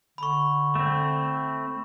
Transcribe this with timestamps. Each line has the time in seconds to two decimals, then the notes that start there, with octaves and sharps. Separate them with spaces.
0.18 D3 B5 C#6
0.75 A3 C4